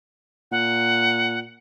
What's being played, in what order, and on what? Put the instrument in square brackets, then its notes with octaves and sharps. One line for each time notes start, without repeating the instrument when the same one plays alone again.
[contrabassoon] A#2 [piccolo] F#5